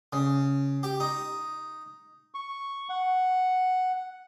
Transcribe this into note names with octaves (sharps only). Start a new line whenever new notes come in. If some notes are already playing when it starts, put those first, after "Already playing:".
C#3
G4
D#4
C#6
F#5